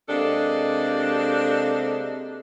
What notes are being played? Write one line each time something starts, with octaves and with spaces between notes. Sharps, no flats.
C3 G#3 A#3 D4 A4